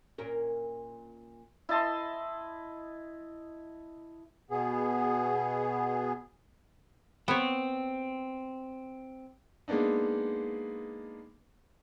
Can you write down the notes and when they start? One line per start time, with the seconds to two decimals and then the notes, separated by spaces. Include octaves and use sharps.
0.18 A#2 C#4 A#4
1.69 E4 D#5 A5 C6
4.51 B2 B3 G#4
7.28 B3 C4 C#5
9.68 G#3 A#3 B3 D4 D#4